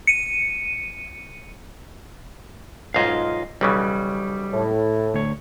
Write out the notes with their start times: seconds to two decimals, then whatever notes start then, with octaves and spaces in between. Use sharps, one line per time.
0.07 C#7 D#7
2.94 B1 G#2 F4 D#5 F5
3.61 B1 C#3 E3 G3
4.53 A2
5.14 D2 C#5